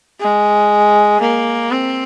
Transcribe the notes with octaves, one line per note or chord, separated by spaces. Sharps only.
G#3
A#3
C4